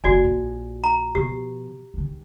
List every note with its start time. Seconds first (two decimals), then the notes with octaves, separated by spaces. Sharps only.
0.04 F#1 D#3 F#4 D5 G#5
0.24 A#1
0.84 A#5
1.15 B2 F3 G4
1.94 D#3 G#3